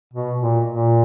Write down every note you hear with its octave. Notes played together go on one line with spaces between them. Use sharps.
B2
A#2
A#2